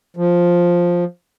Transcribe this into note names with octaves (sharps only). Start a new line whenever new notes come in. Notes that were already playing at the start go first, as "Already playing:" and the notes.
F3